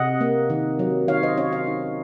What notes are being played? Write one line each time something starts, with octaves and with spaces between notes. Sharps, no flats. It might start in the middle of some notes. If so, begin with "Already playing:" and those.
Already playing: C3 D#5 F#5
A#3
D#3
F#3
D#3 C#5 F5
C5 D#5
C#4 C#5 F5
C#5 F5
D#4